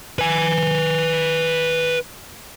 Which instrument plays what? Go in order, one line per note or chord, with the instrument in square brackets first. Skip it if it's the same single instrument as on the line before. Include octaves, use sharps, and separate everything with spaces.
[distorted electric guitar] B4 G#5